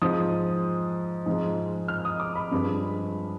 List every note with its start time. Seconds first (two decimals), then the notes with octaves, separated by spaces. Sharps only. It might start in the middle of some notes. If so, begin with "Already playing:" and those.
0.02 G#2 F3 G#3 D#6
1.26 G#2 F3 G#3
1.88 F6
2.05 D#6
2.20 D6
2.36 B5
2.51 G2 F3 G#3